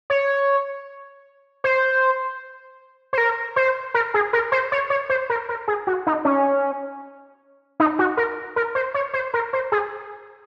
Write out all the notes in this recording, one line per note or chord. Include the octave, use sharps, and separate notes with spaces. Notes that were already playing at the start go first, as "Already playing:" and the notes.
C#5
C5
C5
A#4
C5
A#4
G#4
A#4
C5
C#5
C#5
C5
A#4
A#4
G#4
F#4
D#4
C#4
D#4
F#4
A#4
A#4
C5
C#5
C5
A#4
C5
G#4